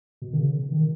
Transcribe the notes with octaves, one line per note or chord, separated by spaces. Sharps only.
B2
D#3
C#3
D#3